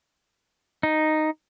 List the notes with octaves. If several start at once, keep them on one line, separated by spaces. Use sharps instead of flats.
D#4